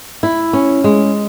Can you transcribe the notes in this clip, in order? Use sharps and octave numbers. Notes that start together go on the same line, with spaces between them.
E4
C#4
G#3